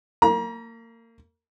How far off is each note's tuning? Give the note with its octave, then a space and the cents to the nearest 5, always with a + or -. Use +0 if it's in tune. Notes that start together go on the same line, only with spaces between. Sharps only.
A#3 -30 A#5 +35